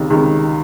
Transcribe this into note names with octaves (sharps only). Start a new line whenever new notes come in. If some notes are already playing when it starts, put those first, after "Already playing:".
Already playing: C#2 C3 D#3
C#2 C3 D#3